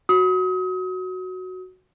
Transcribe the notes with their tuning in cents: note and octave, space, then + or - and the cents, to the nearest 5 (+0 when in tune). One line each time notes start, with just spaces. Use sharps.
F#4 +0 D#6 +35